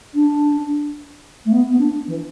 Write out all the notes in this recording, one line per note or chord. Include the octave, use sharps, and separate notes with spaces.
D4
A3
B3
B3
D4
E3